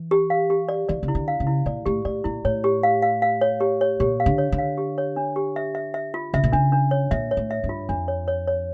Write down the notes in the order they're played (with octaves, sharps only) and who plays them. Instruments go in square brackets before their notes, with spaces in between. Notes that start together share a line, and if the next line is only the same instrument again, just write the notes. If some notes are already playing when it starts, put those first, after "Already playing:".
Already playing: [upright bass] E3
[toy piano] G4
F5
G4
D5
[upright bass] E3 [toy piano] D5
[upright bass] C#3
[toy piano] E4
[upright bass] D3
[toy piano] F5
[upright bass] C#3
[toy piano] E4
[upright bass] A#2 [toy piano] D5
[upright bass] A2 [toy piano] G4
[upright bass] A2 [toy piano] D5
[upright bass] A#2 [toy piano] E4
[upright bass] A2 [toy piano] C#5
[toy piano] G4
F5
F5
F5
C#5
G4
C#5
[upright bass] A#2 [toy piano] G4
[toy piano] F5
[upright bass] D3
[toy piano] C#5
[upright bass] D3
[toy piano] F5
G4
C#5
D4
G4
E5
E5
E5
F4
[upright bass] C#3 [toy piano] E5
[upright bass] A#2
[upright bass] C#3 [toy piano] D4
[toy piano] D4
C#5
[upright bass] A#2 [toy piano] E5
[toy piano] C#5
[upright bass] A2
[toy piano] E5
[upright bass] G2
[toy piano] F4
[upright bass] F2 [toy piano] D4
[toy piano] C#5
C#5
C#5